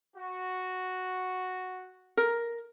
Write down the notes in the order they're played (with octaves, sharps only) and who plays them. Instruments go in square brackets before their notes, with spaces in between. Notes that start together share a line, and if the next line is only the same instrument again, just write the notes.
[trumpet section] F#4
[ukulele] A#4